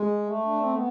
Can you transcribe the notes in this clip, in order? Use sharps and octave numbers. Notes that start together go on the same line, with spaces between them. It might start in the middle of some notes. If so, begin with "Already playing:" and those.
Already playing: G#3
A3
D4
C4
B3